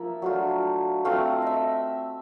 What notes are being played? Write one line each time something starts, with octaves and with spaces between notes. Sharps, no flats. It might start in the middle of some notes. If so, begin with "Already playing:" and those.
Already playing: F3 A#3 F4 E5
F#3 A3 D4 F4
A3 C4 F4 F5
D#5 E5